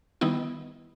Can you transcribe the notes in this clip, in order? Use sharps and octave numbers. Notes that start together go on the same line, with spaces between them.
D#3 G3 B3 D#4 E4